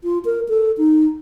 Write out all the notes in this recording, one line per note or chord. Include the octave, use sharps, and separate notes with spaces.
F4
A#4
A4
D#4